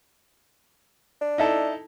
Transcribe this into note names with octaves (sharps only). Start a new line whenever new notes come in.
D4
D#4 E4 A4